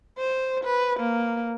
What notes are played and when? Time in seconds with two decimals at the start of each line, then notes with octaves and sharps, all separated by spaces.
0.18 C5
0.64 B4
1.00 A#3